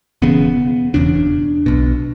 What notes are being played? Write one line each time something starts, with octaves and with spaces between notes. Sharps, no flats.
E1 E2 C#3 B3
E1 E2 C#3 D4
B1 B2